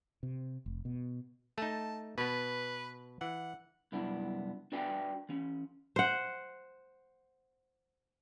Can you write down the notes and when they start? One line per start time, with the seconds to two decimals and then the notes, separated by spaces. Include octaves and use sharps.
0.23 C3
0.66 F1
0.85 B2
1.58 A3 D#4 A5
2.18 B2 B3 B4
3.21 E3 F#5
3.92 C2 F#2 B3 D4 E4
4.72 D4 F#4 B4 D5 G5 G#5
5.29 E3 C#4
5.96 C5 F#5